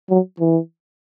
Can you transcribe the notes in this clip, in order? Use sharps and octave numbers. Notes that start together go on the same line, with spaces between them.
F#3
E3